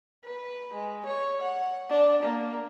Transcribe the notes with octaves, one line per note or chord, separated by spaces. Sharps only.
B4
G#3
C#5
F#5
D4
A#3